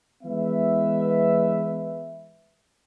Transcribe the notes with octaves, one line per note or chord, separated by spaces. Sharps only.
E3 G#3 B3 B4 E5